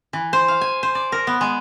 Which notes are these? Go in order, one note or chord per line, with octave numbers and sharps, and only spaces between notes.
E3
C5
F5
G#5
C5
D5
A#4
B3
G#3